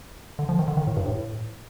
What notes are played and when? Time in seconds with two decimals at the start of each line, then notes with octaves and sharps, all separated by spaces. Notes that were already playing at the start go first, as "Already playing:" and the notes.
0.39 D3
0.49 F3
0.59 D#3
0.68 D3
0.77 D#3
0.87 A2
0.97 G2
1.06 A2